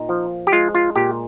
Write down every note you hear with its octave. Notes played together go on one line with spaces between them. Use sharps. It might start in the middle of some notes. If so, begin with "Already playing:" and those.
Already playing: A#2 D#4
F3
G4
G#3 F4
F4
A#2 G4